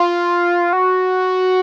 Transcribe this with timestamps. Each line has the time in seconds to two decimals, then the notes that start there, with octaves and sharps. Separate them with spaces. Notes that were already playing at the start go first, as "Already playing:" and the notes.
Already playing: F4
0.73 F#4